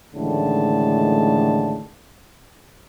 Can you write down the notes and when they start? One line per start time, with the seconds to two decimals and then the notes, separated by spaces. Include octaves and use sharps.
0.16 A1 A2 D3 D#3 G#3 A5